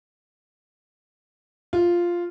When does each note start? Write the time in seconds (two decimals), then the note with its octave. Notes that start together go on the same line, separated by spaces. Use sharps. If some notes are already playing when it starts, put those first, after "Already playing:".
1.73 F4